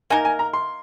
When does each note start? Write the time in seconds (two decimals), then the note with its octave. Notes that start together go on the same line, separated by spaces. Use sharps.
0.10 A#3 D#4 A#4 G#5
0.25 G#5
0.39 A#5
0.53 C6